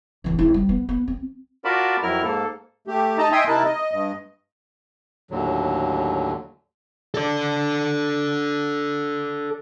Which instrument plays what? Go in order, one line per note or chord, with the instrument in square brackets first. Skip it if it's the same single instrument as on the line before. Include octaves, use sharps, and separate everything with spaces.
[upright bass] D1 E3
G#1 E4
G3
B3
B3
C4
[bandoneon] F4 F#4 A#4 D5 A5 B5
F2 F#3 E4 A#4 F6
G#2 A#3 A4
[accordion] A3 G4
D#4 D#5 A5 A#5
D#5 E5 G5 G#5 C6 D#6
C3 D#4 E4 A#4 A5 F#6
D#5
G2 D#5
[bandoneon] D#2 A2 D3 F#3
[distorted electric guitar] A4 D5